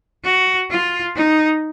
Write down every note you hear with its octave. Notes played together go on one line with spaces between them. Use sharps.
F#4
F4
D#4